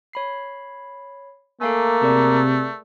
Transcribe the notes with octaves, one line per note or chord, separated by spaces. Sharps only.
C#5 B5 C7
A3 A#3 A4 F5 G#5
C3 G#4 A#4 D5